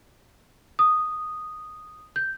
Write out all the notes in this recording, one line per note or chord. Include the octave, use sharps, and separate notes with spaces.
D#6
G6